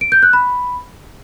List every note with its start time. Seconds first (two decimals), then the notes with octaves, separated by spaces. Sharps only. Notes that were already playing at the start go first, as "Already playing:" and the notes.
0.01 D7
0.12 G6
0.23 F#6
0.33 B5